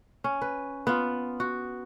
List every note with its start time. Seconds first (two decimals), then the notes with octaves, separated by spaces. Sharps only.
0.24 C#4
0.42 B4
0.87 B3 F4
1.40 F#4